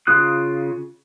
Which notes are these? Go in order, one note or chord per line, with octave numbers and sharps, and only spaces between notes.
C#3 F4 D#6 F#6